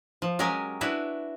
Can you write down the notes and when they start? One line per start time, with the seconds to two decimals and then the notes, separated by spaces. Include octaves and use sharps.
0.22 F3
0.39 F#3 G#3 C#4 G4 A#4 G#5
0.81 D4 E4 F#4 B4 C#5